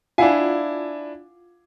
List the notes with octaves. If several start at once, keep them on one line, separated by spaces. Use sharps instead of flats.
D4 E4 F4 F5 F#5 G#5